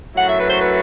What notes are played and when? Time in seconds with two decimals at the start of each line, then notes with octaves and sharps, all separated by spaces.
0.14 F#2 F#3 A3 E4 F#5
0.26 E5
0.37 B4
0.47 C5
0.58 B4